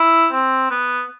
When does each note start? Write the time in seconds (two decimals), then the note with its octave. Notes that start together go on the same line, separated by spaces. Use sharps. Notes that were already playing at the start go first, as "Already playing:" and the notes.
Already playing: E4
0.32 C4
0.71 B3